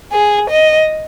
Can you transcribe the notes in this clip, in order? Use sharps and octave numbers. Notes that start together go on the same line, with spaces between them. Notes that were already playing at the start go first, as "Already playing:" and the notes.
G#4
D#5